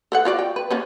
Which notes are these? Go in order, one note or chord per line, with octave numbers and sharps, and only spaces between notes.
A4 B4 F#5
F4 F#4 D5
G5
B4
A#3 B3 C#4